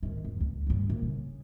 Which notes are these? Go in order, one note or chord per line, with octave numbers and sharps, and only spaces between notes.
D#3 G#3
F2
C#2
C#2 G2
A#2
C#3